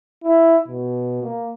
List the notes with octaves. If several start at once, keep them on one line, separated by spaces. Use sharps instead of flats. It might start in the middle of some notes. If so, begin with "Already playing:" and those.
E4
B2
A#3